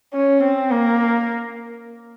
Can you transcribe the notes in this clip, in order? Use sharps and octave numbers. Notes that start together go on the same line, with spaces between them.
C#4
C4
A#3